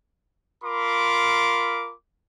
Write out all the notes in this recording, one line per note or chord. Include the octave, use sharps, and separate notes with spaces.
F4 A#4 B5 C6 D6